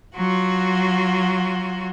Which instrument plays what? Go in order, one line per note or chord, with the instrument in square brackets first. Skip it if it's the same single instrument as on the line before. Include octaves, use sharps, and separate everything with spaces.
[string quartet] F#3 F4 F#4